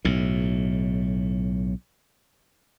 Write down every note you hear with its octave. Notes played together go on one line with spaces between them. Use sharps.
B1 A2